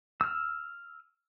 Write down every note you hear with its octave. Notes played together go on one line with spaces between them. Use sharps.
E6 F6